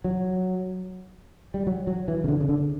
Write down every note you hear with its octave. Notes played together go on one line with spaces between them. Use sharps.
F#3
G3
F#3
F#3
E3
C#3
D3
C#3
D3